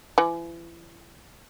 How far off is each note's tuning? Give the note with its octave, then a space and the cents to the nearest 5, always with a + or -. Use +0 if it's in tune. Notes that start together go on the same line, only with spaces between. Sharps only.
E3 +35